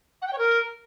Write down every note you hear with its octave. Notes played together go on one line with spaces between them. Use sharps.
F#5
G5
C#5
A#4